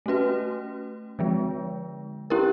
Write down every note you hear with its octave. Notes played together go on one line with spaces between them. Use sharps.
A3 C#4 F#4 B4
D3 F3 G#3
C#4 E4 G4 A#4